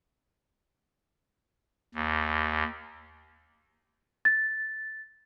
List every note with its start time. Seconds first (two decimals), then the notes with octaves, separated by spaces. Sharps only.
1.95 D#2
4.25 A6